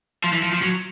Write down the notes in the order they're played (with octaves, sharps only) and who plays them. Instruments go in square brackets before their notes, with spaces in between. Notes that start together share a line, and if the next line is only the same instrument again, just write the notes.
[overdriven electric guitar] F3
E3
F3
F3
F#3